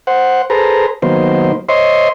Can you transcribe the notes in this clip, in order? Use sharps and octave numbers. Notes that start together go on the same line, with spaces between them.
C5 F#5
G#4 A4 B4 C5 A#5
D#3 F#3 A#3 B3 C5
C5 C#5 D#5 E5 C6